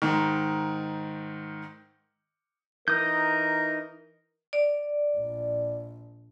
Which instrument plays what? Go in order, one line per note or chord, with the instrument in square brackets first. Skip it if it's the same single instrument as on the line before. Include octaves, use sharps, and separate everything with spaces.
[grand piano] G#2 D#3
[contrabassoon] E3 [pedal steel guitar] D#4 D#6 G6 [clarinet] A#4
[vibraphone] D5
[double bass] A#1